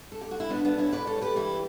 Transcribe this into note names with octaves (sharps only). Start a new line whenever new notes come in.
A4
G4
F#4
E4
A2 B3 D4
B3 D4
G3
C#4 E4
A2 B4 D5
A4 C#5
G3
G4 B4
E3 E4 G4